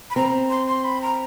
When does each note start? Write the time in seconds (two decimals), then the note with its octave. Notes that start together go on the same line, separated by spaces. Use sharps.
0.10 B5
0.16 C4 A#5
0.50 C6
0.67 C6
0.84 B5
1.02 A#5